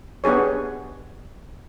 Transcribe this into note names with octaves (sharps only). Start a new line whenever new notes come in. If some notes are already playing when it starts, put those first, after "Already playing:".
B3 D4 G4 G#4 C#5